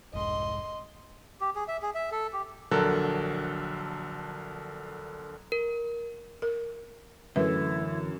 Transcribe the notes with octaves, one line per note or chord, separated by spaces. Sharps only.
F1 C2 G#2 D#5 C6
G4
G#4
E5
G#4
E5
A4
G4
A#1 D3 F#3 A4 A#4 F#6
A#4
A#4
F#2 D3 E3 A3 E4 B4 E5